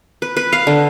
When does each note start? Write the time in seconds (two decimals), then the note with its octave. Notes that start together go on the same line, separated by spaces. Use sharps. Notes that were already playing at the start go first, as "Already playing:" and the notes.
0.22 B4
0.37 B4
0.53 F5
0.67 D3